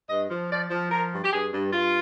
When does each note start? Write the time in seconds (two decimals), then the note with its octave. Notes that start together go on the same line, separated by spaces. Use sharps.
0.09 G2 D#5
0.29 F3
0.50 F3 D5
0.71 F3
0.90 F3 A#4
1.11 G2
1.24 G4
1.32 G2 G#4
1.52 G2
1.72 G2 F4